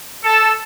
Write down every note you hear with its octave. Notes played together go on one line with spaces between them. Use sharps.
A4